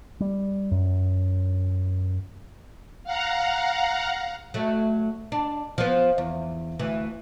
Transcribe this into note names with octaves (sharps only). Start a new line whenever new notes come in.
G3
F#2
F5 F#5 A#5
F#3 A3
D4
F3 B3
E2
D2 E3